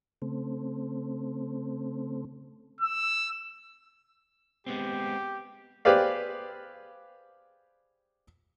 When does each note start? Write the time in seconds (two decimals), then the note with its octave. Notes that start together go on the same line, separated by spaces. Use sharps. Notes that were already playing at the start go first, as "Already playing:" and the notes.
0.22 C#3 A3 C4
2.81 E6
4.66 G#3 B3 C4 G4
5.85 G4 G#4 B4 C5 D5 F5